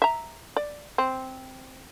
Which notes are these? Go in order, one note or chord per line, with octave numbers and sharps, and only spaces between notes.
E5 A#5
D5
C4